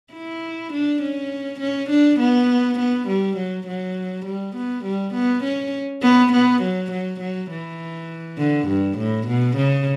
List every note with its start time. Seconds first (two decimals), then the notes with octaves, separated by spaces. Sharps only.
0.14 E4
0.73 D4
1.02 C#4
1.60 C#4
1.90 D4
2.20 B3
2.80 B3
3.08 G3
3.37 F#3
3.67 F#3
4.26 G3
4.56 B3
4.85 G3
5.14 B3
5.44 C#4
6.02 B3
6.33 B3
6.62 F#3
6.92 F#3
7.21 F#3
7.51 E3
8.38 D3
8.68 G2
8.98 A2
9.27 B2
9.57 C#3